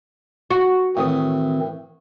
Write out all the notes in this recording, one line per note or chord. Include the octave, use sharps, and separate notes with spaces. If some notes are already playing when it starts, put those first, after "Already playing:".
F#4
A2 D#3 E3 C4 D#6